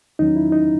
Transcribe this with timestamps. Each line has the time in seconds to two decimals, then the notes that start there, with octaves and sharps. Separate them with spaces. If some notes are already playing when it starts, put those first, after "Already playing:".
0.19 E2 D#3 F#3 C#4 D#4
0.36 E4
0.52 D#4